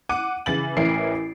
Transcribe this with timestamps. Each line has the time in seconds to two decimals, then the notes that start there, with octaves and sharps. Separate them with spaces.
0.09 F#5 D6 D#7
0.46 C#3 E3 A6 F#7
0.77 A1 E3 E4 A#4 C7 D7